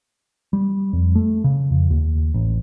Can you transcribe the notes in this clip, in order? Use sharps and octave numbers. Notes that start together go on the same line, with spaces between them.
G3
F2
A3
C#3
F2
D#2
A1